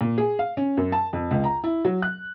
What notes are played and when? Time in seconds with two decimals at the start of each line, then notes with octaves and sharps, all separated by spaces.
0.01 A#2
0.18 G#4
0.39 F5
0.57 C#4
0.77 F#2
0.92 A5
1.13 F2
1.31 C#2
1.44 A#5
1.64 E4
1.85 F#3
2.02 F#6